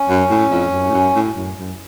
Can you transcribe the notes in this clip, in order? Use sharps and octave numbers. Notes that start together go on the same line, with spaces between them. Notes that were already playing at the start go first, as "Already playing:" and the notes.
Already playing: C#4
F#2
A2
F2
F#2
A2
F#2
A2
F#2
F#2